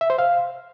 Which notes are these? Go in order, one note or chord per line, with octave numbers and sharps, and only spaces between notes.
E5
C5
F5